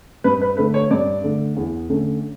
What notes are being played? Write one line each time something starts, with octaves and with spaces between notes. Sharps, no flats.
G2 B4
B4
D3 A3 B4
C#5
G2 D5
D3 A3
E2
D3 A3 C#4